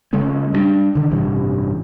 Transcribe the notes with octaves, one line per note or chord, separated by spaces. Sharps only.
C#3 G#3 A3 C#4
G3 A3 D4
D3 D#3
A1 G2 C3 E3